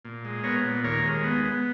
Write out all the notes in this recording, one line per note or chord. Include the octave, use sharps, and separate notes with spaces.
A#2
G#3
B3 A#4 C#5
A#2
D#2 A#4 C#5
G#3
B3
B3